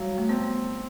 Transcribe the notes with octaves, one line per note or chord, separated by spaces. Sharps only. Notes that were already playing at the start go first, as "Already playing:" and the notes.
Already playing: F#3 G3
A3
B3 C4